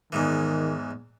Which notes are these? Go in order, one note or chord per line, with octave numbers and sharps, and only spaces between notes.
E2 G#2 D#3 E3